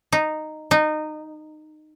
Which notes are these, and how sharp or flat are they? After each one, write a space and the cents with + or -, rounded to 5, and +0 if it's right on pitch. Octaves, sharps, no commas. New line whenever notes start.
D#4 -10
D#4 -20